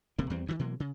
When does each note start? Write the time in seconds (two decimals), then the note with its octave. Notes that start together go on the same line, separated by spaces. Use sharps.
0.18 E1 C3 A#3
0.30 E2 E3 G3 C4
0.46 D2 B2 D#3
0.59 B2 E3 F#3 A#3
0.80 C#3